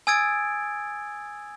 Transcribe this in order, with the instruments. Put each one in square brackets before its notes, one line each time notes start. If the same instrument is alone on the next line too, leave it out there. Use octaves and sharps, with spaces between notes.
[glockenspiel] G#5 D#6 E6 G#6 A6 D7